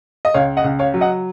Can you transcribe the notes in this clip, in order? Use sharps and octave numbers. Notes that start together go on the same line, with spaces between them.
D#5
C#2 C#5 F5
D#5 F#5
C#2
C#5 F5
F#3
D#5 F#5